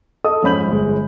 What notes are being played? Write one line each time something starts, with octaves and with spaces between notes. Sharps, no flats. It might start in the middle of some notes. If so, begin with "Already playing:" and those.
A4 D#5 D#6
F2 G#2 C#4 B5 G6 F#7
G1 G#3